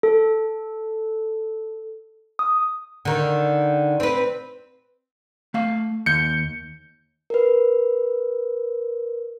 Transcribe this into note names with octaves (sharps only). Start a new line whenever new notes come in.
A4
D#6
D3 D#3
C4 B4
A3 F5
D#2 G6 C#7
A#4 B4